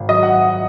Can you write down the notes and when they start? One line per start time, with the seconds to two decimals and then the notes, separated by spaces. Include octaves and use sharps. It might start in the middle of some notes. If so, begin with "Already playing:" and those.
Already playing: G#1
0.09 F#3 D#5
0.23 F#5